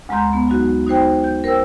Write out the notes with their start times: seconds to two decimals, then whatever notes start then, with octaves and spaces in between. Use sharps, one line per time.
0.09 D2 G#3 A#5 C6 G6
0.33 B3
0.48 F#3 D#4 F#4
0.87 D#4 F#4 C5 G5
1.24 G6
1.44 A#4 C5 G5 E6